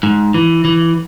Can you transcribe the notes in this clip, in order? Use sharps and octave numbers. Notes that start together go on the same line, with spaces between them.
G#2
E3
E3